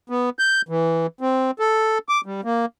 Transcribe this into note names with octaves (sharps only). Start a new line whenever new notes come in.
B3
G6
E3
C4
A4
D6
G3
A#3